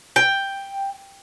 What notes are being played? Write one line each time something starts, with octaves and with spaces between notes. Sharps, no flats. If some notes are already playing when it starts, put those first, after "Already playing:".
G5